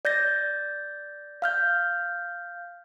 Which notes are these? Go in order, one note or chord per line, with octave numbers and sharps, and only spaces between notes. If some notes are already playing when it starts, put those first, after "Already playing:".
D5 G6 A6 A#6
F5 F6 G6